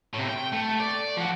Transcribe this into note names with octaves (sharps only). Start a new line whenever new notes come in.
A2 C3
G5
A3
D5
F3 F#4